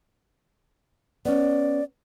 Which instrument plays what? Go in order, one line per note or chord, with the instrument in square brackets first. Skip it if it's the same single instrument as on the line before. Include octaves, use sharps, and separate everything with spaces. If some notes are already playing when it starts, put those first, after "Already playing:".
[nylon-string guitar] B3 C#4 [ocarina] D5